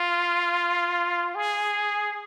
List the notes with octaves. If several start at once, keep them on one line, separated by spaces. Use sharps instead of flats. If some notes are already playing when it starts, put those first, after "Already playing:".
Already playing: F4
G#4